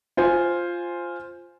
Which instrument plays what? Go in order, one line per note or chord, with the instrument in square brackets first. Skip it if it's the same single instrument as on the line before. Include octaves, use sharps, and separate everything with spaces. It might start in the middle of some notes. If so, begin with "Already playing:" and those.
[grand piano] F4 C5 G#5